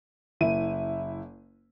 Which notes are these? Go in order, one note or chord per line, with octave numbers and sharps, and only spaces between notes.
F#1 E4 D#7